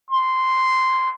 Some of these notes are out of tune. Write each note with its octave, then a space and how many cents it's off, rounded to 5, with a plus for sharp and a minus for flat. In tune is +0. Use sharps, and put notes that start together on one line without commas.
C6 -5